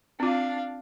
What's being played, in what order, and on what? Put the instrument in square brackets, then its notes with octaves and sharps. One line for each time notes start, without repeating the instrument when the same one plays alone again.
[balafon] C4 F4 [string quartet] D4 F5